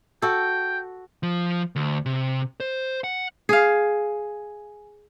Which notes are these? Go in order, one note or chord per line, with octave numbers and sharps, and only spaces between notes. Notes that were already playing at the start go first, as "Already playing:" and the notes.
F#4 A4 G5
F3
D2
C3
C5
F#5
G#4 F5